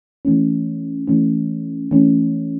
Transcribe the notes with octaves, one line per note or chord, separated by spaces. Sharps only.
E3 A3 C#4
E3 A3 C#4
E3 A3 C#4